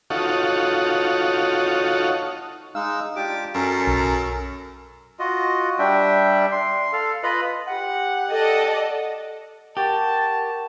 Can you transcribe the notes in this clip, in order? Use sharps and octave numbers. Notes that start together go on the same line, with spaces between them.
D#4 F4 F#4 A4 C#5
G#3 D#4 F5 E6
D4 F4 G4 D6
F#2 C#4 A4 A#4
B1
F4 F#4 D#5
G3 D4 E5 G5
C6
A4 F5
F4 B4 D#5 B5
G4 F#5
A4 D5 D#5
G4 A#4 F#5 A5 C#6